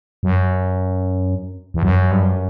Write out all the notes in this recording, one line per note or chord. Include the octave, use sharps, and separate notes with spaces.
F#2
E2
F#2
G2
F#2